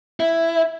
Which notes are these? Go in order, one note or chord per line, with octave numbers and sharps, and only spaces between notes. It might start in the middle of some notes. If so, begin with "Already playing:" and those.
E4